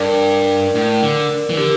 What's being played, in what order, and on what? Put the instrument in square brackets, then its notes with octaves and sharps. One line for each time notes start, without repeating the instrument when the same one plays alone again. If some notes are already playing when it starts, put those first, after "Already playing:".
Already playing: [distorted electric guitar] G2 [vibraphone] A#4 D5
[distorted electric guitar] A2
D3
E3
[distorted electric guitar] D3 [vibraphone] G4 A#4